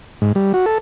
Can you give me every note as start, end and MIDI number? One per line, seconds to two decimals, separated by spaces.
0.22 0.32 44
0.35 0.53 55
0.54 0.66 66
0.66 0.78 69